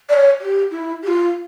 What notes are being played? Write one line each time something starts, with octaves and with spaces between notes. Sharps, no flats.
D5
C#5
G4
E4
G4
F4